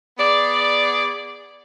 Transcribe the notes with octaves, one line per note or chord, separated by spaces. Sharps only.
B3 G#4 D5